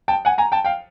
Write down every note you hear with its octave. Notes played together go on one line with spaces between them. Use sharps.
G5 A5
F#5 G#5
G#5 A#5
G5 A5
F5 G5